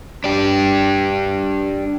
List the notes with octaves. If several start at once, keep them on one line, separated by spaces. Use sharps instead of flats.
D4 G4